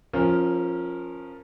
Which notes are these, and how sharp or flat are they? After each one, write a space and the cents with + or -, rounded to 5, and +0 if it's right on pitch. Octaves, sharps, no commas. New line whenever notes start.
F3 +5 C#4 -20 A#4 +0